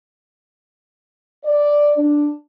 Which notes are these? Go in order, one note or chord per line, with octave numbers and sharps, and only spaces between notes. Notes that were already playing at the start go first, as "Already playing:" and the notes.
D5
D4